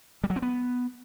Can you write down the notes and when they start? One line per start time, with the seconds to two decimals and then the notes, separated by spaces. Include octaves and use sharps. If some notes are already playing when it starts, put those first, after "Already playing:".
0.24 G3
0.30 F#3
0.36 C4
0.42 B3